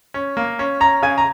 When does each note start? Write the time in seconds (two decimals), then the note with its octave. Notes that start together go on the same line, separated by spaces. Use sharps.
0.14 C#4
0.37 A#3
0.59 C#4
0.80 C#4 A#5
1.02 C#3 G#5
1.18 A#5